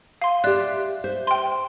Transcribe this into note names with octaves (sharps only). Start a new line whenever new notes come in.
F5 C6
G4 D5 E5 F#6
C5 E5
G5 C6